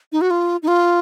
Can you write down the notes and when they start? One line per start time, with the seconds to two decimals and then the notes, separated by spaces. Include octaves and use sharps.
0.12 D#4
0.21 F#4
0.31 F4
0.63 D#4
0.68 F4